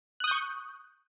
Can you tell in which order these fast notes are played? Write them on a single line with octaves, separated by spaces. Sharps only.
F#6 D#6 G6 C#6